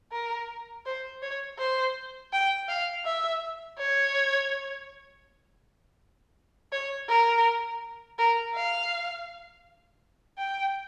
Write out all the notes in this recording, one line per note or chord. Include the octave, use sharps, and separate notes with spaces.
A#4
C5
C#5
C5
G5
F5
E5
C#5
C#5
A#4
A#4
F5
G5